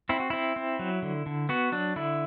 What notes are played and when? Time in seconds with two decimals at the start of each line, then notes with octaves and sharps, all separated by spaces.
0.09 C4 E4
0.20 F#4
0.30 C4 E4
0.56 C4
0.79 F#3
1.02 D3
1.26 D3
1.49 B3 F#4
1.72 F#3 D4
1.96 D3 E4